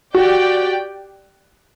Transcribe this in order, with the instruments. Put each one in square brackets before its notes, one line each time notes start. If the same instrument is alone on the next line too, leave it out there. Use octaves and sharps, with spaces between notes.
[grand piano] F#4 [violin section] G4 D5 G5